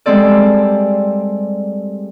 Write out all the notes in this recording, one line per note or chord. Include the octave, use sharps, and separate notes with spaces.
G3 G#3 C4 A4 D5